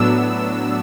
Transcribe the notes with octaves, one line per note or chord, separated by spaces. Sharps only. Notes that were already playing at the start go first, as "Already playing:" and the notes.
Already playing: A2 F#3 B3 D4 E6